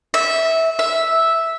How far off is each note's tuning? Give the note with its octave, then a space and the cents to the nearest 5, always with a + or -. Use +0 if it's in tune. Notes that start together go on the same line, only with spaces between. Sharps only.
E5 -15
E5 -5